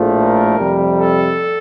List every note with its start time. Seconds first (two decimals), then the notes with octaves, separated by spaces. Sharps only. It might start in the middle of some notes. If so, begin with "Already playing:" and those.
Already playing: A#1 A2 F3 A3
0.20 A#4
0.58 F2 C3 G3
0.97 A4